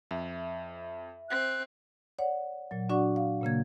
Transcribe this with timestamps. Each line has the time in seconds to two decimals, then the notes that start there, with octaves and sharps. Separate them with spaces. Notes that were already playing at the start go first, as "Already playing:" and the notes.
0.11 F2 E5
1.30 C4 F#6
2.19 C#5 D5 F#5
2.71 A#2 F#3
2.89 D4 F#4 D5 F#5 C#6
3.16 F5
3.42 A#2 C#3 A#3 G#6